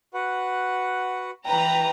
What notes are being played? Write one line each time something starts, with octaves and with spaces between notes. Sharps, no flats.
F#4 B4 F#5
E3 B4 G5 A#5